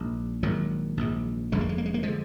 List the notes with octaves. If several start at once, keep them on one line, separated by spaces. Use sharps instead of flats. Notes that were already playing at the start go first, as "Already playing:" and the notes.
Already playing: A#1 G#2
A#1 G#2 D#3 F#3
A#1 G#2
F1 F2 D3 G#3
A#3
G#3
A#3
G#3
A#3
D3 F3 G#3